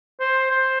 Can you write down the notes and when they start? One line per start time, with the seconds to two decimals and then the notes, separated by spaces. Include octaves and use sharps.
0.20 C5
0.51 C5